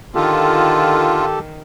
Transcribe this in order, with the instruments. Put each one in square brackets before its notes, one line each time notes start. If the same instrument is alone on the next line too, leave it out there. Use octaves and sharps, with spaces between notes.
[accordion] D3 F4 [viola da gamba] D#3 [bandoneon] G4 A4